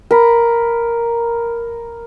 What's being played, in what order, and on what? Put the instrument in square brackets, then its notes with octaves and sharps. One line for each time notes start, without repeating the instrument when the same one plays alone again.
[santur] A#4 B5